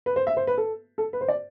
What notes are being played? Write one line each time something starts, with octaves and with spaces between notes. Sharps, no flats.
B4
C5
E5
C5
B4
A4
A4
B4
C5
D5